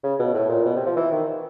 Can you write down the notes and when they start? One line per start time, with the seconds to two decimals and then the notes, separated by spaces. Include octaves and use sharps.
0.03 C#3
0.19 B2
0.34 A2
0.49 A#2
0.65 B2
0.76 C3
0.86 F3
0.96 E3
1.12 D#3